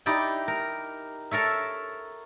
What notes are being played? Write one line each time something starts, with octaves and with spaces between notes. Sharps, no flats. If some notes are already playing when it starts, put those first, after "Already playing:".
D#4 E4 G4 D5 G5
A#4
A4 A#4 C#5 E5